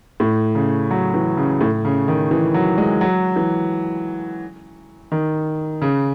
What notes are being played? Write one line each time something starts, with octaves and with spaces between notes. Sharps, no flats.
A2
C#3
F#3
E3
C#3
A2
C#3
D#3
E3
F#3
G#3
F#3
E3
D#3
C#3